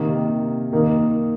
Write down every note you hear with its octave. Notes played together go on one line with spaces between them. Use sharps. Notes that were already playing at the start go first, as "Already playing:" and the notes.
Already playing: C3 D#3 A#3 D#4
D#3 A#3 D#4